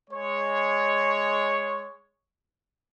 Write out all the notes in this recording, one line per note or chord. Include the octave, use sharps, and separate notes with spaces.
G#3 C#5